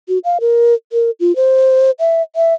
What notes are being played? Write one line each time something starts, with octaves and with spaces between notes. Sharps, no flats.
F#4
F5
A#4
A#4
F4
C5
E5
E5